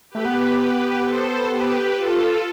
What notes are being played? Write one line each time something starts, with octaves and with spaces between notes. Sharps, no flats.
G4 B4
A3
B3
G4 B4
A4 C5
G4 B4
F4 A4